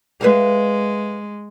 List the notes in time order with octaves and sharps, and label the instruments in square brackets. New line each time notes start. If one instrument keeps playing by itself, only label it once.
[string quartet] G#3 [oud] B4 E5 F5